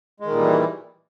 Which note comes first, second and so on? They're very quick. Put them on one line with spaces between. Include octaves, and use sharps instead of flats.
G#3 D#3 A#2 G3 E3